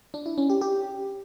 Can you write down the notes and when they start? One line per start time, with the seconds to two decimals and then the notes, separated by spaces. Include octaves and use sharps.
0.14 D4
0.26 E4
0.38 C#4
0.50 G4
0.61 G4